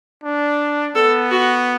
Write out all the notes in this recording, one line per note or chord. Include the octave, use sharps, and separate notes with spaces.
D4
B3 A4
F#4